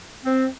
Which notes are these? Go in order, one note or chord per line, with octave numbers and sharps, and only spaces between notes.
C4